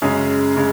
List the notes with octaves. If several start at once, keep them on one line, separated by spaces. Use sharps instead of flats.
F#2 C#3 G#3 C#4 G#4
C#3 G#3